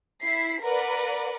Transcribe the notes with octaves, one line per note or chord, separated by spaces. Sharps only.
E4 B6 C7
A#4 B4 D5 F#5